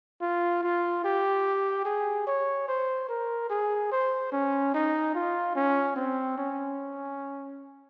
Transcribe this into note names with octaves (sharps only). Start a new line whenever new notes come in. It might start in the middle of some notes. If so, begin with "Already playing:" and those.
F4
F4
G4
G#4
C#5
C5
A#4
G#4
C5
C#4
D#4
F4
C#4
C4
C#4